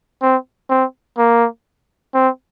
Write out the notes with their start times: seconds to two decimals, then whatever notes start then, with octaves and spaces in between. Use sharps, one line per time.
0.22 C4
0.70 C4
1.18 A#3
2.14 C4